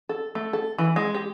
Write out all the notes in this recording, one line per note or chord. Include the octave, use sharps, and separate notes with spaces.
A4
A3
A4
E3
G#3
G4